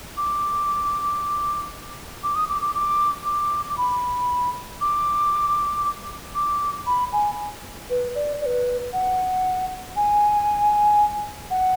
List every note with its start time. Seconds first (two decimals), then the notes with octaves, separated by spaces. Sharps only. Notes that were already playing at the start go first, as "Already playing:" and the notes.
0.17 D6
2.24 D6
2.35 D#6
2.49 D6
2.62 D6
2.75 D6
3.25 D6
3.69 D6
3.78 B5
4.81 D6
6.35 D6
6.86 B5
7.13 G#5
7.90 B4
8.15 D5
8.41 D5
8.46 B4
8.93 F#5
9.96 G#5
11.51 F#5